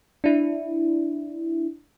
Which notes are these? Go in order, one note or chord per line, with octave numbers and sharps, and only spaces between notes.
D4 E4